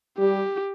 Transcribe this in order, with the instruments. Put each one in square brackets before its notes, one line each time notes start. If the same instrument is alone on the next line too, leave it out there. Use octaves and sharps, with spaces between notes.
[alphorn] G3 [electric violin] G4